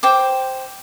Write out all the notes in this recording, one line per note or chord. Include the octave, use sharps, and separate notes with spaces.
C5 G5 D6